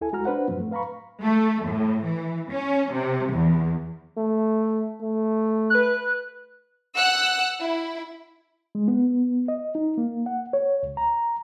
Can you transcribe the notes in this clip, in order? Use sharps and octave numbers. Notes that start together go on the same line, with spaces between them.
D2 E4 A4 G#5
G#3 F#4 A#5 F6
D4 B4 C5 F#5
F#2 A2 F3 F#3 C4
A2 A3
B4 F5 A#5 B5 C#6
A3
A2
E3
C#4
C3
E2
A3
A3
B4 F#6
F#5 E6 F#6
E4
G#3
B3
D#5
D#4
A#3
F#5
C#5
C#2
A#5